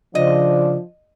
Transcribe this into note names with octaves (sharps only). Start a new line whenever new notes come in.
C#3 F3 D4 D#5